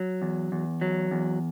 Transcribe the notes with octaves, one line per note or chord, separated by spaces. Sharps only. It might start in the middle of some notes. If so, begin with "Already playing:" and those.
Already playing: F#3
E2
E2
F#3
E2